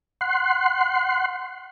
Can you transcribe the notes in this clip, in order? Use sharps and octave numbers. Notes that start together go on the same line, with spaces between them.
F#5 C6